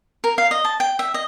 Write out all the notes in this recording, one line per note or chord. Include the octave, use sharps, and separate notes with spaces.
A#4
F5
D#5
A5
G5
E5
D#5